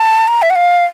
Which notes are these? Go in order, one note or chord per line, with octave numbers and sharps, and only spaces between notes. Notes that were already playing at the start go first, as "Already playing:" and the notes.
Already playing: A5
A#5
E5
F#5
F5